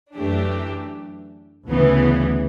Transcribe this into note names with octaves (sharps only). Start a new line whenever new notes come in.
F#2 E3 A3 D4 G4
D2 C#3 E3 B3